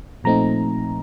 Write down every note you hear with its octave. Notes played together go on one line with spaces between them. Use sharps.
A#2 F3 A3 C4 D#4 A#5